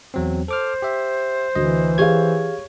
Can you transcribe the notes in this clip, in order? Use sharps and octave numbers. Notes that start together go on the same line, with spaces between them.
E2 F#3 C4
A4 C5 D6 F6
G4 E5
D2 E3 D#5
G4 G#4 C#5 F5 G#6